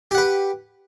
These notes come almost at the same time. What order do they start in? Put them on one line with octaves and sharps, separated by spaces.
G4 F#5 B4